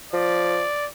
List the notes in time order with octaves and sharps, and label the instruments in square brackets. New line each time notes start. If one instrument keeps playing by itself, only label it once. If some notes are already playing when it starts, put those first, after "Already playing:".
[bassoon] F3 [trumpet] D5